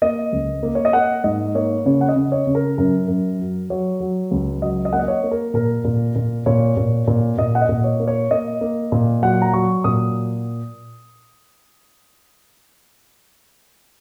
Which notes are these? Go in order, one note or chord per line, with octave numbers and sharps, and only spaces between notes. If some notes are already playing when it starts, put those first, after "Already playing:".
A#3 D#5
C#2
A#3
C#5
D#5
A#3 F#5
G#2 D#5
A#3 C#5
C#3 C#5
F#5
D#5
C#3
C#5
C#3
A#4
F#2 A#4
F#2
F#3
F#3 C#5
F#3
C#2
F#3 D#5
D#5
A#3 F#5
D#5
C#5
A#3
A#4
A#2 A#4
A#2
A#2
A#2 C#5
A#2
A#2
A#2 D#5
F#5
D#5
A#2
C#5
A#3
C#5
A#3 D#5
A#3
A#2
F#3 F#5
A#5
F#3 C#6
A#2 D#6